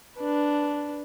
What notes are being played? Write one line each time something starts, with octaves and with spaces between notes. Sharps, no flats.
D4 B4